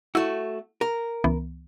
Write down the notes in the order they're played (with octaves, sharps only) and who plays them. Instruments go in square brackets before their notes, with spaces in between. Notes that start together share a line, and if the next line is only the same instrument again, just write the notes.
[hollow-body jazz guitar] A3 F#4 [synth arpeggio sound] E4
[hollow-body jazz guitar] A#4
[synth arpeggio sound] C#2 E3 B3